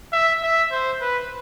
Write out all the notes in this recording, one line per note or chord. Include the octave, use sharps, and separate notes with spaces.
E5
E5
C5
B4